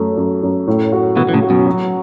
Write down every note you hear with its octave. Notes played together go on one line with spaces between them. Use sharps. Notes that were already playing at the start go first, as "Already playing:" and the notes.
Already playing: F#2 A3
F#2
F#2
A2
F#4
B2 E3 F#4
E3
A2 C#3
F#4
F#2 B2
F#3